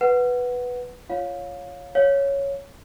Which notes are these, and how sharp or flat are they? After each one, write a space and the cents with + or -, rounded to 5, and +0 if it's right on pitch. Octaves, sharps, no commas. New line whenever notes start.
B4 +0 F#5 +0
F4 -20 C#5 +0 F5 +20
C#5 +0 F5 +0